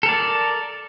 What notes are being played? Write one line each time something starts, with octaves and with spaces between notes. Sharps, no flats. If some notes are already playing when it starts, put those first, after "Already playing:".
A4 A#4 D5